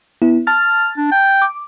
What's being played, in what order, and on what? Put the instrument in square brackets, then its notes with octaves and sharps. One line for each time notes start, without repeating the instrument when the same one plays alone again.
[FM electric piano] B3 E4
[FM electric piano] A5 A6 [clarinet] F6
[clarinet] D4
G5
[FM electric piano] D6